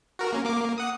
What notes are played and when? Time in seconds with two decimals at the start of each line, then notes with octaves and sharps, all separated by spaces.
0.19 F#4 A#4
0.32 A#3 C#4
0.45 A#3 D6
0.61 A#3
0.78 F#5 D#6